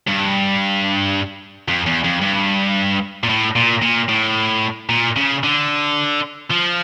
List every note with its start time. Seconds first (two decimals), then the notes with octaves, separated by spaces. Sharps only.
0.08 G2
1.68 F2
1.86 E2
2.04 F2
2.21 G2
3.23 A#2
3.29 A2
3.56 A#2
3.82 A#2
4.09 A2
4.89 A#2
5.16 C#3
5.43 D3
6.50 F3